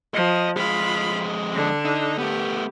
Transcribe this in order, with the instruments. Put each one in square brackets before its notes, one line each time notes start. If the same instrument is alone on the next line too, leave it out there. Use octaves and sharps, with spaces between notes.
[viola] F3 [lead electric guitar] D#5
[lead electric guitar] F2 G#3 [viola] F4 B5
[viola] D3 D4
[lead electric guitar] D#4
[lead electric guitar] A3 B3 [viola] G4